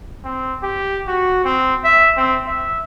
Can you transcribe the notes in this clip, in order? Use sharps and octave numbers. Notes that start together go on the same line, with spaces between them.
C4
G4
F#4
C4
E5
C4
E5